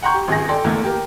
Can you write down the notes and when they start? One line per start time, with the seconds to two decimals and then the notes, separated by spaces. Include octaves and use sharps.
0.03 F#5 G5 A#5 C6 C#6 G6
0.14 G4
0.28 G#1 C#2 G#4 A#6
0.49 A4 D5 G5 C6
0.64 E2 D3 A3 A#3
0.84 G4 A#4